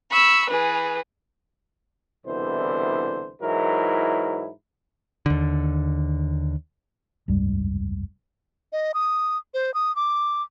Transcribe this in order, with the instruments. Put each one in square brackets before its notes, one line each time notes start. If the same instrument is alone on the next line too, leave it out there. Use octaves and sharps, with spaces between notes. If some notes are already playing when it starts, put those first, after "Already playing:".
[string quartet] B5 C#6 E6
E3 G#4 B4
[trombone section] C2 B2 D3 E3 C5
G#2 E3 F#3 E4 A#4
[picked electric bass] D#2 D3
[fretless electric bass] F1 C#2 G2 G3
[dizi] D#5
D#6
C5
D#6
D6